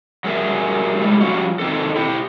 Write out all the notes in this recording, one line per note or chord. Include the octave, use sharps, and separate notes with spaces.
F#3 G3 G#4 A#4 E5
A2 G3 G#3
F3 G3 C#4 F4 F#4
D#3 C4 A4
E4 G4 G5